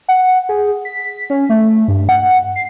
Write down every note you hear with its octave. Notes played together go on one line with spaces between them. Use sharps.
F#5
G#4
B6
C#4
A3
G2
F#5
C7